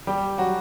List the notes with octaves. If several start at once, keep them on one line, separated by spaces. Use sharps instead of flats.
G3 G4
F#3 F#4